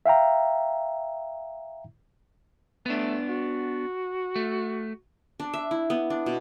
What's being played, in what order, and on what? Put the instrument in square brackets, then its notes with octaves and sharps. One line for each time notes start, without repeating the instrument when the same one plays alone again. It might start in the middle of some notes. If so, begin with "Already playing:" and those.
[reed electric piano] E5 F5 G5 A#5
[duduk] A3 [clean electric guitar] B3 D4
[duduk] F#4
[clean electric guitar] A3
[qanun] D4
E5
E4
B3
D4
B2